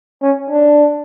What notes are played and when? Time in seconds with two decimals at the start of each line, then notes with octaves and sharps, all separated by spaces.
0.22 C#4
0.50 D4